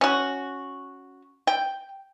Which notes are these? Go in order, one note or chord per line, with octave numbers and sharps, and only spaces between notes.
C#4 F#4
G5